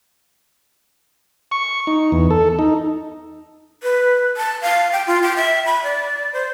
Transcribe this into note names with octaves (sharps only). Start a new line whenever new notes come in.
C#6
D#4
E2
A4
D#4
B4
A5
F5
G5
F4
G5
E5
B5
D5
C5